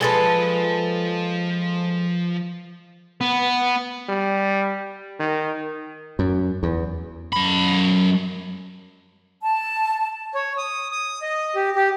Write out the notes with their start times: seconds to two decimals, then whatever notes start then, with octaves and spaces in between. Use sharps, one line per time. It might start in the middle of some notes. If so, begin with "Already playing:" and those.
0.01 F3 G#3 A4 B4 C6
3.21 B3
4.09 G3
5.20 D#3
6.19 F#2
6.63 E2
7.32 F#2 B5
9.41 A5
10.35 C#5
10.58 D#6
10.92 D#6
11.22 D#5
11.56 G4
11.76 G4